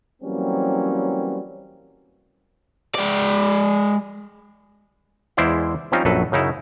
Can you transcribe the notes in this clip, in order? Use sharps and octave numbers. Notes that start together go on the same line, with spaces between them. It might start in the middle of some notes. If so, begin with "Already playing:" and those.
E3 F#3 G3 A#3 C4 C#4
G#3 D5
E2 G#3 E4 C5 D5 F5
F3 G3 C4 C#4 D#4 F4
A#1 F#2 F#3 A4 B4
F#2 C#3 D#4 E4